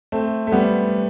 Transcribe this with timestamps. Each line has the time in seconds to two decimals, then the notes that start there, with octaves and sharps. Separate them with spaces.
0.12 A3 C4
0.47 A3
0.52 G3 B3